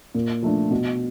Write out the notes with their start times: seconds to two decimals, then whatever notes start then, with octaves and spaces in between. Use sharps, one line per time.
0.15 A#2
0.43 F3 A3 D4
0.71 B2